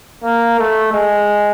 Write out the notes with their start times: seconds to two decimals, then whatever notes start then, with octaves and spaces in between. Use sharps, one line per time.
0.24 A#3
0.59 A3
0.93 G#3